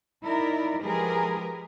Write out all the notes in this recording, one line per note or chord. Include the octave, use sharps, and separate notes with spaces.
D#4 E4 A#4 D5
F3 G#3 G4 G#4 A#4 B4